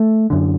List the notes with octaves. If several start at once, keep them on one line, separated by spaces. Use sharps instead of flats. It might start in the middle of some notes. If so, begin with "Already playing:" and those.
Already playing: A3
F#2 D3